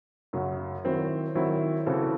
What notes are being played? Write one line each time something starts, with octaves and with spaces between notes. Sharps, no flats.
F#2 C#3 F#3
D#3 F#3 C4 E4
D#3 F#3 C4 E4
C#3 E3 C4 F#4 A4